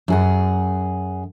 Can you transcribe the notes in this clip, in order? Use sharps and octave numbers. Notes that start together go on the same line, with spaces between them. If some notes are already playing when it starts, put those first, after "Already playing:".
F#2 G#4 F#5